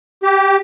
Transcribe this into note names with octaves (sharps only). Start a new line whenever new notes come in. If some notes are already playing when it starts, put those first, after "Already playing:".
G4